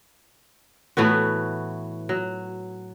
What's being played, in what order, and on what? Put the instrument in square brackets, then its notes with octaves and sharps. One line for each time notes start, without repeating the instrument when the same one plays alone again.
[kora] A2 E3 B3 F#4
F#3